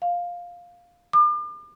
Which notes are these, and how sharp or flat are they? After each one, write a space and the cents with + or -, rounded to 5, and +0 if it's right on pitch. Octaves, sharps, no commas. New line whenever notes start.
F5 +10
D6 +40